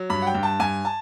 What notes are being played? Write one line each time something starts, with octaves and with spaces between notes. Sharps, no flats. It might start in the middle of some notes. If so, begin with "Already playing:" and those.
Already playing: F#3
G2 B5
F#5
G5
G2
A5
G2 G#5
A5